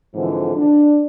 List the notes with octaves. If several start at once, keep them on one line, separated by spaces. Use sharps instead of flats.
G#2 D3 E3 F3 C4
D4